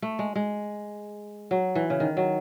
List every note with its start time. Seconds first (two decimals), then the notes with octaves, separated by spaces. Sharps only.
0.02 A3
0.19 G#3
0.36 G#3
1.51 F#3
1.75 E3
1.90 C#3
2.00 D#3
2.17 F#3